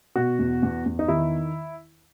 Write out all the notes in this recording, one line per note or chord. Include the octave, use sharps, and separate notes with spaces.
B2 F#4
E2
E2
E2
D#4
D#3 E4